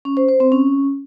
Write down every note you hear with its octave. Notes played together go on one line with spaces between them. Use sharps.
C#4
C5
C5
C4
C#4